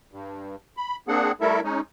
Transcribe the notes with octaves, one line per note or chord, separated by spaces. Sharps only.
G2
B5
A#3 C4 D4 G#4 F#5
G3 A3 E4 A4 A#4 E5
G#3 C#4 D#4